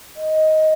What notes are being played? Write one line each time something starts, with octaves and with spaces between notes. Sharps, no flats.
D#5